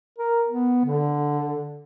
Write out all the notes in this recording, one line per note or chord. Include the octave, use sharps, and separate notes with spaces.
A#4
B3
D3